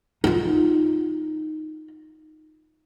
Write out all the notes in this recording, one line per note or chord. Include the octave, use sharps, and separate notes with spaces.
D#4 F4